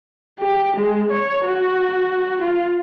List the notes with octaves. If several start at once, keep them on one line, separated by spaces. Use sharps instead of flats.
G4
G#3
C#5
F#4
F4